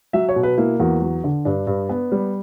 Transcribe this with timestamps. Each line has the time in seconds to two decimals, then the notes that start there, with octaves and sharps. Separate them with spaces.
0.13 F#3 E5
0.29 C#5
0.36 B2
0.43 B4
0.58 A#3 E4
0.80 E2 F#4
1.02 F#3
1.24 D3
1.45 G2 D4
1.67 G2
1.89 B3
2.12 G3